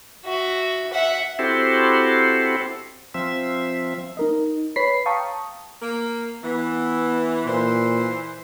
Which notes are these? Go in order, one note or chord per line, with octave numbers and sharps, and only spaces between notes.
F#4 E5
E5 F#5
C4 E4 F#4 G4 A4 C5
F3 C4 E5
D#4 A#4 D#5
B4 C#5 B5 B6 C7
F5 G5 A5 A#5 C#6 D#6
A#3
E3 B3
A#2 E3 C5